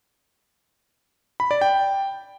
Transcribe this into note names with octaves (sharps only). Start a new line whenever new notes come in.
B5
D5
G5